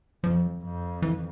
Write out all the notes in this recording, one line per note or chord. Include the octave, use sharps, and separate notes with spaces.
F2 F3
F2
E3